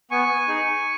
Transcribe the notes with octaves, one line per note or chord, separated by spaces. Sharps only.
B3 G#5 C#6
D#4 G#4